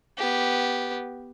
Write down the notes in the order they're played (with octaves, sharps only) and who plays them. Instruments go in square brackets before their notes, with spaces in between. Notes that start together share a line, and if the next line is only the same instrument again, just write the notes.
[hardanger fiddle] B3 G4